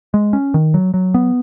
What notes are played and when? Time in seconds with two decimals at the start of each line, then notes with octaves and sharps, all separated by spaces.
0.14 G#3
0.33 C#4
0.54 D#3
0.74 F#3
0.94 F#3
1.14 B3